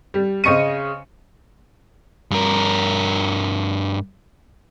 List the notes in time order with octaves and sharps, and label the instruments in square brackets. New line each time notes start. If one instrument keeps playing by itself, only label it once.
[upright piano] G3
C#3 C5 D#5 C#6 C#7 D#7
[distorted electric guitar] G2 A#4